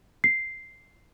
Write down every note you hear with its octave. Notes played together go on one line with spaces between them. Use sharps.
C7